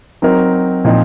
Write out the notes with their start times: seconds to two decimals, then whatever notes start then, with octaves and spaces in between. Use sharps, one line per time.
0.22 F#3 C4 D#4 A#4
0.85 A#2 F3 C4 D#4